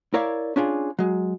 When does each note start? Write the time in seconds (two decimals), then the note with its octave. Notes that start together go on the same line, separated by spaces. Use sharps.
0.14 E4 A#4 C#5 D5 E5 F5
0.56 C#4 D4 F4 G#4
0.99 F#3 G#3